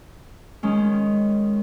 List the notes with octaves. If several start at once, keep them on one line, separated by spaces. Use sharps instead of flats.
D#3 G#3 C#4